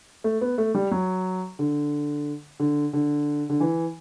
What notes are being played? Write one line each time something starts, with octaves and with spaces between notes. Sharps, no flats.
A3
B3
A3
G3
F#3
D3
D3
D3
D3
E3